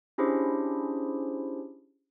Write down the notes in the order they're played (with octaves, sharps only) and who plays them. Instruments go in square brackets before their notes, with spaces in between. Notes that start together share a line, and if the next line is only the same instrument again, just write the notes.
[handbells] C#4 D4 E4 G4 G#4 C5